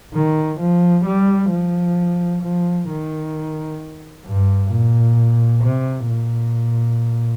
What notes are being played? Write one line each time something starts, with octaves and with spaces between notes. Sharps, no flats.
D#3
F3
G3
F3
F3
D#3
G2
A#2
C3
A#2